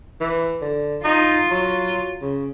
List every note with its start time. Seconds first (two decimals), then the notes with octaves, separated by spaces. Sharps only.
0.21 E3
0.62 D3
1.04 D#4 F4
1.51 F#3
2.22 C#3